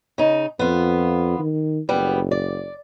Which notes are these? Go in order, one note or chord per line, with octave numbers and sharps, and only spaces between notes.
C#3 D#4
F2 B3 F4
D#3
F#1 G3 B3
D5